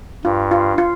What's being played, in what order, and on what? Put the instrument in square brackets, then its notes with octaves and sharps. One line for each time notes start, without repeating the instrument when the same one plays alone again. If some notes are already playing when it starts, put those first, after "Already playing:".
[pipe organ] G2 [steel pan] F4
[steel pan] F4
F4